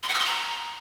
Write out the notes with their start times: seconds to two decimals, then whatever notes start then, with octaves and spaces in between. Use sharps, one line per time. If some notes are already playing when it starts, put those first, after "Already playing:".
0.03 C6
0.09 F#5
0.14 E6
0.20 C6
0.25 A#5